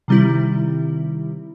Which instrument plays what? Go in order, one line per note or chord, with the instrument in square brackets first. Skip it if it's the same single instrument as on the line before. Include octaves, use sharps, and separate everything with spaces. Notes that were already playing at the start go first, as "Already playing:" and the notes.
[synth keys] C3 D#3 G3 C4 E4